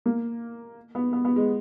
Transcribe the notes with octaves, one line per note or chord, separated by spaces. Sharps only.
A#3
B3
B3
B3
G#3